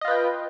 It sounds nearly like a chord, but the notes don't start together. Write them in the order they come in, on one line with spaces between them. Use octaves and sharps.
D#5 F4 B4 G5